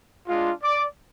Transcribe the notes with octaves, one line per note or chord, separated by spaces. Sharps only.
G#3 D4 F4
D5 D6